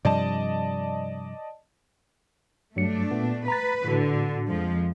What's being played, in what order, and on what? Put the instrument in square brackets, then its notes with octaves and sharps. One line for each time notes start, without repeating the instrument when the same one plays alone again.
[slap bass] G2 C3 F3 [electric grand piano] D5 D#5 A5
[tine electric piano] G2 F#3 C#7 [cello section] A3 D4
[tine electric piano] A#2 B3
[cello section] B4 [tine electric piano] A#5 B5 A6
[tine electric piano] A2 F#4 [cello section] D3
[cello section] F2 F3 G#3